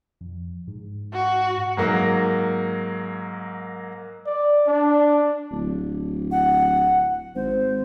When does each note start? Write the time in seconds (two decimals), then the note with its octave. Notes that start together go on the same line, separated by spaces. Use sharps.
0.21 F2
0.67 G#2
1.13 F#4
1.77 G#2 F#3 A#3
4.26 D5
4.67 D4
5.51 D1
6.31 F#5
7.35 G#1 C5